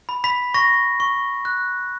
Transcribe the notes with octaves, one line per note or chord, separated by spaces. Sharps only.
B5
B5 B6
C#6 A#6
C#6
F#6